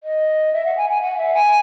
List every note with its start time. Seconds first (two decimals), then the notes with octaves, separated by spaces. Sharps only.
0.03 D#5
0.53 E5
0.65 F#5
0.77 G#5
0.89 G#5
1.01 F#5
1.17 E5
1.33 G#5